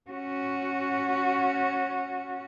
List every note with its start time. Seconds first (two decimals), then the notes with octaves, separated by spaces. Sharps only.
0.10 C#4 F#4